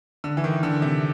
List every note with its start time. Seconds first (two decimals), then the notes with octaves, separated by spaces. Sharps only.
0.24 D3
0.37 E3
0.44 D#3
0.63 D3
0.82 C3